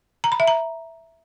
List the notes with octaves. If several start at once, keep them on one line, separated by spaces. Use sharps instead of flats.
A#5
B5
E5
A#5